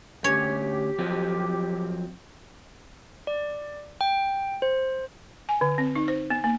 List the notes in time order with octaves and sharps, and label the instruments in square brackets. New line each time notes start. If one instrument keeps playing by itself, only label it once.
[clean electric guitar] D2 C#4 [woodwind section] G4 [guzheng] C#5
[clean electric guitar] F3 F#3 C4
[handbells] D5
G5
C5
[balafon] G#5
D3
C4
D#4
C5
B3
A#3